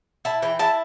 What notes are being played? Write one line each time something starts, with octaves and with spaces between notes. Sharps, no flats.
E4 A5
E3 G5
E4 A5